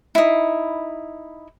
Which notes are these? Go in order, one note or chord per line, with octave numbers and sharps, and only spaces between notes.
D#4 E4